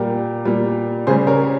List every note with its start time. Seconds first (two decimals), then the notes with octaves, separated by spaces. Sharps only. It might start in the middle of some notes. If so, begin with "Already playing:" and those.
Already playing: A#2 G3 G4 A#4
0.45 A#2 G3
1.07 C#3 G3 G#4 C5
1.27 A#4 C#5